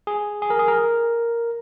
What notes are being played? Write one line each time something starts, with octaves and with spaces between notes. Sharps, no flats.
G#4
G#4
A#4
G#4
A#4